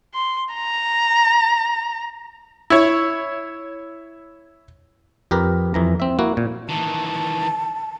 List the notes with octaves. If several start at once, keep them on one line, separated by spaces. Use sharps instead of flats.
C6
A#5
E4 C#5
F2 G4 A#4 B4
F2 E3 A#5
C4 E5
A#3 E4 F#4
A#2
D#3 E3 A5